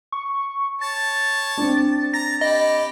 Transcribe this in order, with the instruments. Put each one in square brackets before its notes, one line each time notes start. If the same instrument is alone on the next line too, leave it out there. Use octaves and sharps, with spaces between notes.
[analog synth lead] C#6
[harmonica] C#5 A5 [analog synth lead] A6
[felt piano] C4 D4
[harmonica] A#5 [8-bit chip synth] A#6
[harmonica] G4 B5 [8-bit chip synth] D#5